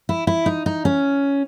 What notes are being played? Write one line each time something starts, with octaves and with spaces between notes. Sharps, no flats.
E4
E4
D#4
D#4
C#4